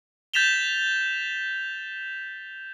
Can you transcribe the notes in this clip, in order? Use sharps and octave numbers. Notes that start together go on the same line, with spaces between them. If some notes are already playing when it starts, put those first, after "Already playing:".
G6 A6 B6 E7 F7 G7